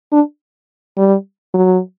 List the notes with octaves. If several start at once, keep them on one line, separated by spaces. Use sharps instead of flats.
D4
G3
F#3